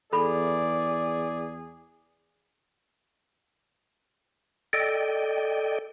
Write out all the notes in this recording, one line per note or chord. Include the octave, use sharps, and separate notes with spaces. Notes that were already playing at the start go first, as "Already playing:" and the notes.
E2 G#4 A4 D5 B5
A4 D5 D#5 G5